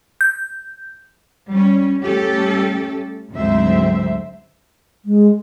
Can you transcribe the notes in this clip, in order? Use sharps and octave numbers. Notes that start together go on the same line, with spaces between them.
G6
G3 C#4
G3 A3 C#4 G4 A4
D2 G#2 F#3 C4 C5 E5
G#3